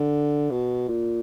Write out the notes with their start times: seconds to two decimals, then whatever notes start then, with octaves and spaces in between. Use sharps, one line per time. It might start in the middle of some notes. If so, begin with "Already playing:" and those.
Already playing: D3
0.51 B2
0.88 A#2